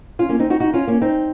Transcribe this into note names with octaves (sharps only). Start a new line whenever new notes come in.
C#4 F4
A#3 C#4
C4 D#4
D#4 F#4
D#4 F#4
C#4 F4
A#3 C#4
C4 D#4